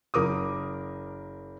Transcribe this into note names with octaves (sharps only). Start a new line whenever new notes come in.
F#1 A#4 D6 D#6